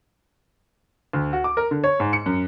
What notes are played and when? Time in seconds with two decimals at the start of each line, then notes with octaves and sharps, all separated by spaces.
1.13 D2
1.33 F#4
1.44 D6
1.57 A#4
1.71 D3
1.84 C#5
2.00 G#2
2.13 C#7
2.26 F#2